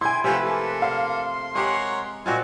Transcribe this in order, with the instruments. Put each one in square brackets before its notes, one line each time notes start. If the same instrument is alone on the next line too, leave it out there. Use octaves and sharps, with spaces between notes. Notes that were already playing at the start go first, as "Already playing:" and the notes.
[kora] E4 G5 [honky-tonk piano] G#5 C6 [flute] G#6
[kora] C3 F3 A3 [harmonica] F4 E5 F#5 [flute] B4
[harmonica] A#3 A4
[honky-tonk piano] F5 [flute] C6
[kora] G#3 G4 [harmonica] A#4 C#5 F#5
[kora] A#2 C4 F4 [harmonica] D#4 G#5 [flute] F#4